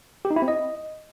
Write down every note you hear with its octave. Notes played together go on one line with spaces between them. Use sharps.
G4
D#4
E4
C4
D#5